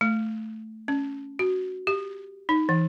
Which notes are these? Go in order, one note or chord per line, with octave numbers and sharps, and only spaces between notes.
A3
C#4
F#4
G4
D#4
E3